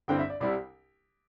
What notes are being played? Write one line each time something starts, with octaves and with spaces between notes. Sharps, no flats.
G1 G2 D3 C4 E4 G5
E5
D5
C2 C3 G3 E4 D5